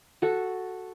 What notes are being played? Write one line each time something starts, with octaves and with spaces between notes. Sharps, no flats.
F#4 A4